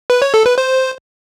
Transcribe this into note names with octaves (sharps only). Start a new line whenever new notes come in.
B4
C#5
A4
B4
C5